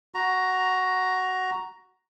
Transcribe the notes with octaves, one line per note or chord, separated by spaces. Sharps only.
F#4 A#5